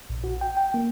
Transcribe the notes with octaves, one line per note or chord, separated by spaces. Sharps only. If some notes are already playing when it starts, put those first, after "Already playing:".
A#1
F#4
G5
G5
A#3